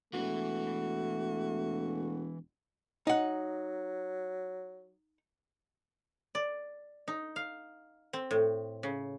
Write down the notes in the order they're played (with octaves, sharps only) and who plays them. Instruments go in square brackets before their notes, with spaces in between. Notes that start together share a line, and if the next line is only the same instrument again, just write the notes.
[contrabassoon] E1 [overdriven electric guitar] E3 B4 [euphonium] A3 [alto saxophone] F#4
[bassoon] F#3 [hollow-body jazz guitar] D#4 F#5
[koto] D5
D#4
F5
C4
A2
C#3